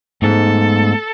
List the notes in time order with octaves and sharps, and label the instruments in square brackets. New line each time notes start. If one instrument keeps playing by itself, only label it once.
[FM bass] G#2 [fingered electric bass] A3 B3 [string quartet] A4